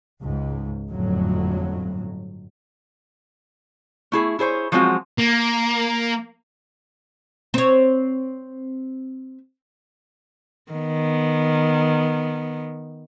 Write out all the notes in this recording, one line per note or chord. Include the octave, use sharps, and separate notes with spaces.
C#2 G#2
G1 F2 A2 F#3
A3 E4 G#4
E4 G#4 C5 C#5
F3 F#3 G#3 C4 F4 F#4
A#3
C4 C#5
D#3 B3